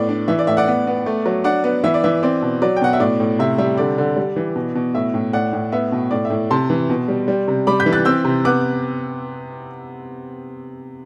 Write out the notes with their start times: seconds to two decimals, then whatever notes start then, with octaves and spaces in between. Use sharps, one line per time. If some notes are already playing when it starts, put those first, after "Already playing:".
Already playing: A2 B3 D5
0.09 D4
0.28 E3 E5
0.39 D5
0.47 A2 E5
0.57 D5 F#5
0.68 B3
0.87 B3
1.06 A3
1.26 F#3
1.44 D4 D5 F#5
1.64 B3
1.84 E3 E5
1.94 D5
2.04 E3 E5
2.23 C4 D5
2.42 B2
2.62 F#3 D5
2.76 G5
2.82 B2 F#5
2.93 E5
3.00 A2 D5
3.20 A2
3.39 C3 E5
3.58 G3 E5
3.78 D3 D5
3.98 D3
4.17 G3
4.36 E3
4.56 B2
4.75 B2
4.95 A2 E5
5.14 A2
5.33 A2 D5 F#5
5.53 A2
5.72 B3 E5
5.92 B2
6.11 A2 D5
6.25 E5
6.30 A2
6.50 C3 A5 C6
6.70 E3
6.90 B2
7.08 G3
7.28 G3
7.48 C3
7.67 G3 B5 D6
7.80 G6 B6
7.86 E3
7.93 F#6 A6
8.05 C4 E6 G6
8.25 C3
8.45 B3 D6 F#6